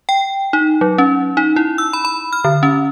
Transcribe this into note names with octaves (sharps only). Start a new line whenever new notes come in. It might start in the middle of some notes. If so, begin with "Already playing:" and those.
G5
D#4
F#3
C#4
D#4
E4
E6
B5
B5
F6
D3
C#4